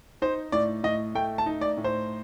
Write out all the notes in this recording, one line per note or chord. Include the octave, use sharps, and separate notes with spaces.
D#4 C5
A2 D5
A2 D#5
A3 G5
A5
D#4
D5
A2
C5